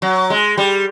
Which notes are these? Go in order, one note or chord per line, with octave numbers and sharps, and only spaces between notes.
F#3
G#3
G3